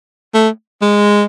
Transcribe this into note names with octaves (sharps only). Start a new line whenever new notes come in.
A3
G#3